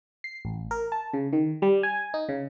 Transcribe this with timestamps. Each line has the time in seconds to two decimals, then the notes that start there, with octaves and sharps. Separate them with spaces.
0.24 C7
0.45 A1
0.71 A#4
0.92 A5
1.13 C#3
1.33 D#3
1.62 G3
1.83 G#5
2.14 D#4
2.29 C#3